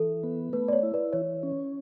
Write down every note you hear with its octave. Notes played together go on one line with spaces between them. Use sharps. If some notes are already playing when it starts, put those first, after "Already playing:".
Already playing: E3 A4
B3
A3 B4
D5
C#5
E4
B4 D5
E3 C#5
C#4